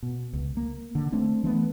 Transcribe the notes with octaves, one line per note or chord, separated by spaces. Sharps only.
B2
C#2
A#3
D3
A3 C4 D4
E3 A3 B3